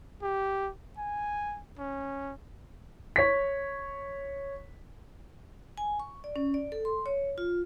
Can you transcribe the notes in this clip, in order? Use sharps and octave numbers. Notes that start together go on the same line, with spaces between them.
G4
G#5
C#4
C#5 B6
G#5
C#6
D5
C#4
D5
A4
C6
C#5
F4